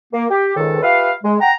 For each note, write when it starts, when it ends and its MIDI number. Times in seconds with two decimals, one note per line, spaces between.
0.14 0.25 58
0.30 0.52 67
0.56 0.79 37
0.56 0.79 44
0.56 0.79 51
0.56 0.79 69
0.82 1.11 65
0.82 1.11 67
0.82 1.11 71
0.82 1.11 76
0.82 1.11 77
1.23 1.36 56
1.40 1.50 78
1.40 1.50 79
1.40 1.50 82